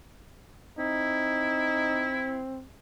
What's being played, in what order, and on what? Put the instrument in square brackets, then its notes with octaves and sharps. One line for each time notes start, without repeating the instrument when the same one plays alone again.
[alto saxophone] C4 [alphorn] D#4 [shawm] E4